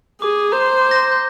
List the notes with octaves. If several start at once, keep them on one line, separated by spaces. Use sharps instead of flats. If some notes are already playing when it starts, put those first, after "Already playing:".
G#4 D6
C5 A#5
C6
D6
G6 A#6
G6